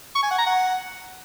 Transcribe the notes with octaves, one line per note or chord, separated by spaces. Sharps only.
C#6
G#5
F#5
A#5
F#5